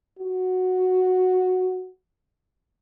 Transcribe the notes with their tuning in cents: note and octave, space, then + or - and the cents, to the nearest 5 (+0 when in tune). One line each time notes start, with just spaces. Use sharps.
F#4 -5